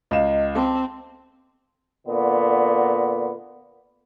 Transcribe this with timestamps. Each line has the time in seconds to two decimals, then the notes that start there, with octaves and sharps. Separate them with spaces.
0.11 C#2 D#5 F5 E7
0.55 C4 A5 D6
2.07 A#2 D3 B3